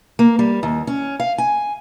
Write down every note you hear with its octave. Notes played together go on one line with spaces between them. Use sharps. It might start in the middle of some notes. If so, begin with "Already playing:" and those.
A#3
G3
D#2
C#4
F5
G#5